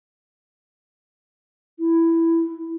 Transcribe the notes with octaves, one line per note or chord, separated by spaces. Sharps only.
E4